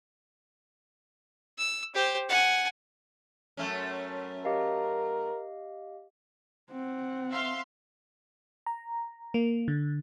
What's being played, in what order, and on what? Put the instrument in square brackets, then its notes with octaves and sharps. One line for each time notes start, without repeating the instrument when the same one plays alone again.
[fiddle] E6
G4 C5
F#5 G#5
[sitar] F#2 A3 C#4
[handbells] G4 D#5 F5 [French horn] A#4
[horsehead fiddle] C4 F#5
[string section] E5 F5 C6
[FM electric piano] A#5
A#3
D3